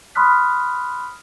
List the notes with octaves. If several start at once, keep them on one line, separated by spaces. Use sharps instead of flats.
B5 C6 D#6 F6 F#6 B6